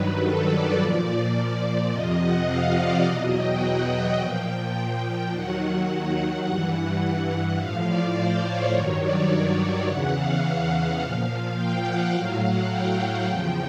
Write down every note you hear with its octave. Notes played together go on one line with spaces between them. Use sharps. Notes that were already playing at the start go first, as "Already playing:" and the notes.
Already playing: G2 D#3 F#3 B4
A4
D5
A#2 F3
F2 C3 F3 D#5
F#5
F5
D5
E2 B2 F#3 D#5
G5
F#5
G5
A#2 F3
D#2 D#3 F#3 F#5
G2 E3 F#5
A2 F3 F5
D5
C5
C#5
G2 D#3 F#3 C#5
D5
E2 C#3 E3 F#5
F5
A#2 F3
G5
F#5
A2 F#3 F5
F#5
G5
F#5
E2 C#3 F3 G5